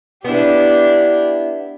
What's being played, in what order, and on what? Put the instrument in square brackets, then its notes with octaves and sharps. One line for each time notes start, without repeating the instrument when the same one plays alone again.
[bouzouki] B3 E4 [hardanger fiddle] D4 G4